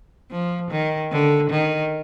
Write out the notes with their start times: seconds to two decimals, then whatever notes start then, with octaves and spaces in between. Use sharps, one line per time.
0.31 F3
0.71 D#3
1.12 D3
1.50 D#3